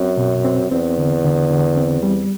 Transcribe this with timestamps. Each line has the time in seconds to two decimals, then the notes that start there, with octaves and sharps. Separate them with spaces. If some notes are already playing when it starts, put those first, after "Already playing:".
Already playing: F#2 C4
0.17 B2
0.45 C4
0.71 E2 C4
0.98 D3
1.24 D3
1.51 D3
1.77 C4
2.03 G3